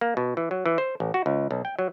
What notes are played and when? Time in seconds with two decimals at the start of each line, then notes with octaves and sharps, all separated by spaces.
0.01 A#3
0.17 B2
0.37 E3
0.51 F#3
0.66 E3
0.78 C5
1.00 A1
1.14 F#4
1.26 C#2
1.51 B1
1.65 G5
1.79 F#3